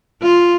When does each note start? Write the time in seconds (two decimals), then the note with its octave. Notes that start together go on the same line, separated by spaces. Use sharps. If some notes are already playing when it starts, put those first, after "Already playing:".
0.23 F4